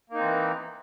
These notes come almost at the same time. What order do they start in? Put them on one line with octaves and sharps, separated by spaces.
A#3 D#4 C4 E3